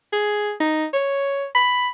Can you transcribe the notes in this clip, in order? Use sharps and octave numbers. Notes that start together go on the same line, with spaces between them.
G#4
D#4
C#5
B5